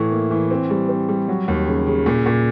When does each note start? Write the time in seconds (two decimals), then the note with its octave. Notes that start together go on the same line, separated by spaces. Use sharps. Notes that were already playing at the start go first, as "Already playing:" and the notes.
Already playing: A2 E3
0.12 A#3
0.31 E3
0.50 C4
0.70 G3
0.89 C4
1.09 G3
1.28 F#3
1.48 D#2
1.67 C#3
1.87 C#3
2.06 A#2
2.26 A#2